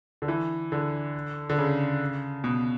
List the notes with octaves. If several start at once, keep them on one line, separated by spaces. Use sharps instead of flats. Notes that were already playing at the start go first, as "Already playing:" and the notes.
D3
E3
D3
D3
C#3
B2